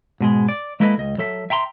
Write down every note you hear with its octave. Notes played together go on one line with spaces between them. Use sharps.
G#2 B2 G#3
D5
G#3 A#3 E4 A4 B4 D#5
C#2 D#5
F#3 A4 E5
E5 G5 A#5 C6